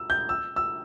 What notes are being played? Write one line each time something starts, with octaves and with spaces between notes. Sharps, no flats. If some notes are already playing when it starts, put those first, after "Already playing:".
Already playing: E6
G6
E6
E6